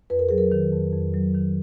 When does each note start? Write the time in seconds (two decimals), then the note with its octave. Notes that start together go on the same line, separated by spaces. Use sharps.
0.10 F2 B4
0.19 A#4
0.29 F#3 G#4
0.38 A#4
0.52 D#3
0.73 F2
0.93 F2
1.14 F#3
1.35 D#3